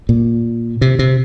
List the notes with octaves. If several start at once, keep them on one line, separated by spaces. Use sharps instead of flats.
A#2
C3
C3